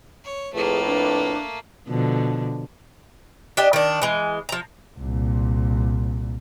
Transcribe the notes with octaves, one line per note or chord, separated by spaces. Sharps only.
C#5
F2 A2 A3 A#3 G#4 B4
D4
B2 D3 F3
D4 G4 D#5
D#3 D4
E3 G#3
F3 A#5
C2 A#2